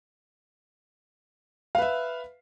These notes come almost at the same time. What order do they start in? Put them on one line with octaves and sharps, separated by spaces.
F5 B4 E5